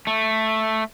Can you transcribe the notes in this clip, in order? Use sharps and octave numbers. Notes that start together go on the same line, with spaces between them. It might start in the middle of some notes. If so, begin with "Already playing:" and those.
A3